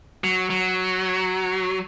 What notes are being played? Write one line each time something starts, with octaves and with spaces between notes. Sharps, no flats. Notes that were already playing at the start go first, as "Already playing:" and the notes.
F#3
F#3